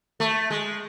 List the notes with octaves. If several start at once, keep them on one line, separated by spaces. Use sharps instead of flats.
A3
G#3